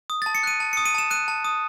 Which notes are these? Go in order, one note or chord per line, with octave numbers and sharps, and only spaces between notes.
D#6
A6
A5
C#7
F#6 D#7
A5
C#7
D#6
D#7
A5 E7
F#6 D#7
A5
D#6